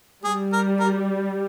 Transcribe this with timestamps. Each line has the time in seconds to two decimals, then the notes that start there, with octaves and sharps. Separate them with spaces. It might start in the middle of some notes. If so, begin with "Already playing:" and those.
0.24 G3 G#4
0.52 A#4
0.80 A#4